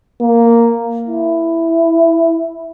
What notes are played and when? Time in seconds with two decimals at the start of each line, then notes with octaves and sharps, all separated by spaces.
0.21 A#3
1.07 E4